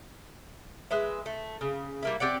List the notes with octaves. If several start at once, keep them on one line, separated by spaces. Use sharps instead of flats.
G#3 B4 E5
A3
C#3
G3 A#3 E4
C4 G4 D5 F#5